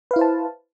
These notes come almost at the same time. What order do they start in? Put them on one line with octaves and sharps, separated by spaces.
B4 F5 E4 C5 A5